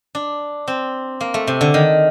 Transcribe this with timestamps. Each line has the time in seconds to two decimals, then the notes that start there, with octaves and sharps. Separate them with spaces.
0.15 D4
0.68 C4
1.21 A#3
1.34 A3
1.47 C3
1.61 D3
1.74 D#3